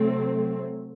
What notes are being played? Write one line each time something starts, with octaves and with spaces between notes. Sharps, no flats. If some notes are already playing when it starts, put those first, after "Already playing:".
Already playing: C3 F#3 A3 C4